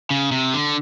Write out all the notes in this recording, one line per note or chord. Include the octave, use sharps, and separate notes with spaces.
C#3
C3
D3